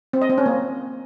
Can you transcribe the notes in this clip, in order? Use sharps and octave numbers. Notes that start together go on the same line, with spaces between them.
C4
D#5
C4
C#4
A#3